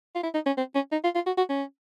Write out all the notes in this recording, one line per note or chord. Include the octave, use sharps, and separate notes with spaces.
F4
E4
D#4
C#4
C4
C#4
D#4
F4
F4
F#4
F#4
C#4